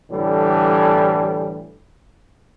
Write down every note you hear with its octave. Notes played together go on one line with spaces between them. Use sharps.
A2 D3 E3 G3